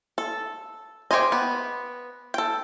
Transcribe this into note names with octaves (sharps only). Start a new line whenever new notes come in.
A4
G4 G#4 C5 D#5
B3
A4 G5